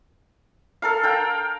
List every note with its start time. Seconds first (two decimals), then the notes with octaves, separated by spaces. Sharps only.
0.82 A4 A#4 F5
1.03 F5 G5 A#5